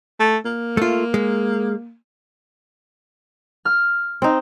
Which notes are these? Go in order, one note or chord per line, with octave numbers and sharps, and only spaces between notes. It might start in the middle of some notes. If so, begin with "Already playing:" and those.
A3
A#3
A3 F4
G#3
F6
C4 D#4